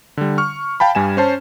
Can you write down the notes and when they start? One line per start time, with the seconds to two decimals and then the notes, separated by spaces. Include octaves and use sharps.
0.17 D3 G3
0.38 C#6 F6
0.80 F5 G5 A5 B5
0.95 G2 G3 G#5 E7
1.17 C#4 C5 A5